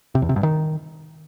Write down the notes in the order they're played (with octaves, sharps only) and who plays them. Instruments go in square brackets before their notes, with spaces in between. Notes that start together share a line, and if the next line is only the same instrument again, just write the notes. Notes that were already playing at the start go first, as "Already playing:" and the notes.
[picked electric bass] C3
E2
C3
G2
D#3